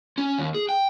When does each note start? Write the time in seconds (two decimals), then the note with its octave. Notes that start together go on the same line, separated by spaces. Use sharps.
0.18 C#4
0.38 D#2
0.54 G#4
0.69 G5